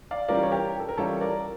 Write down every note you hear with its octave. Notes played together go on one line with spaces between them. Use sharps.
D5 F5
E3 G3 C#4 F4 A#4 D5
C#5
G4 A#4
A4
A#4
E3 G3 C#4 F4 A4 C#5
A#4 D5